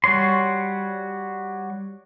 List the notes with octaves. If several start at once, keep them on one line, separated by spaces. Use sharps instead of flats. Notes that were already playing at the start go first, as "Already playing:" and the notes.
G3 F#4 C#5 C6